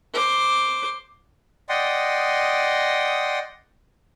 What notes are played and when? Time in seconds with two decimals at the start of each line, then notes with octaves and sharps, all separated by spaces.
0.13 C5 D6
1.69 D5 D#5 F#5 G5 C6 D#6